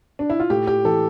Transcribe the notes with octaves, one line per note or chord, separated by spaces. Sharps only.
D4
E4
F4
A2 G4
G4
E3 A4